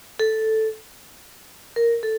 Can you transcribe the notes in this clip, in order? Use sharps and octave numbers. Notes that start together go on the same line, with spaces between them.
A4
A#4
A4